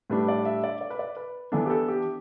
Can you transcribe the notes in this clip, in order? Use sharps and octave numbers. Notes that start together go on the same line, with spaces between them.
A2 G3 D4 B4
D5
E5
D5
D5
B4
D5
B4
E3 B3 D4 A4
G4
A4
G4